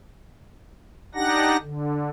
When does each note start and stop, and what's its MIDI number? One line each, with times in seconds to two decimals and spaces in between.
1.15 1.57 62
1.15 1.57 63
1.15 1.57 67
1.15 1.57 78
1.15 1.57 94
1.61 2.10 50